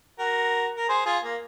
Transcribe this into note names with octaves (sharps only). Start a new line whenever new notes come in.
F#4 A#4
A#4
G#4 C5
F4 G#4
A#3